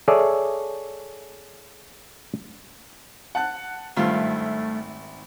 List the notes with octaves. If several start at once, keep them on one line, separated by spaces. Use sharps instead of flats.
G#4 A4 C#5 D5 E5
F#5 A5 F#6
G#1 G2 A3 F4 E5